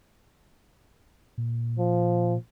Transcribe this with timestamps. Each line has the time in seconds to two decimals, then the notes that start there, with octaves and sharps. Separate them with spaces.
1.38 A#2
1.79 F3